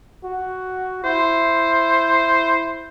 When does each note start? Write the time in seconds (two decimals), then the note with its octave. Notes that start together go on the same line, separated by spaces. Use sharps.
0.24 F#4
1.04 E4 C5